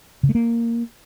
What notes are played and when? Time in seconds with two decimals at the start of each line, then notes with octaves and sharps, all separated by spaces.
0.23 C#3
0.29 A3
0.35 A#3